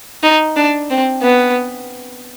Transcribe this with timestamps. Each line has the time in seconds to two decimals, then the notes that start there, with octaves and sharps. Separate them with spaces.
0.23 D#4
0.56 D4
0.90 C4
1.22 B3